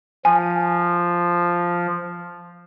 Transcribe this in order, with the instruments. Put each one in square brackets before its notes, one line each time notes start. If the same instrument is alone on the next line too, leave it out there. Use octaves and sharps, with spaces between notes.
[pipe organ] F3 [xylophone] G#5